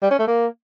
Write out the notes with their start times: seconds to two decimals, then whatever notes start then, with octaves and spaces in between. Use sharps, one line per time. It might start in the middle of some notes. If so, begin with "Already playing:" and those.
0.02 G3
0.11 C#4
0.19 A3
0.28 A#3